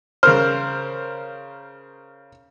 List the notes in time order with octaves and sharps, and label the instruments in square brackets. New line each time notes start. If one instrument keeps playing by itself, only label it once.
[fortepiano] C#3 A#4 C5 [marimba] F6